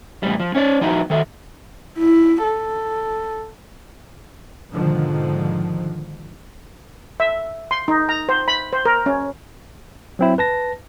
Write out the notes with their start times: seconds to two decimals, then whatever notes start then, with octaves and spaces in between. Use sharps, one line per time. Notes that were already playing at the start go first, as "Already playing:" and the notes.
0.23 E2 A2 G3
0.40 F3
0.55 C#4 C#5 D5
0.81 F3 B3 D#4 E4 F#4
1.10 D#3 A4 E5
1.98 E4
2.43 A4
4.72 G#2 B2 D3 D#3 F3
7.20 E5
7.71 C6
7.88 D#4
8.09 A#5
8.29 C5
8.48 B5
8.73 C5
8.85 A#4
9.06 C#4
10.19 F#3 C4 E4
10.38 B4 A5 A#6